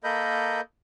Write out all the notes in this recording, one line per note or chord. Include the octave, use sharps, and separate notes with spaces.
A#3 A4 A#4 D#5 B5 G6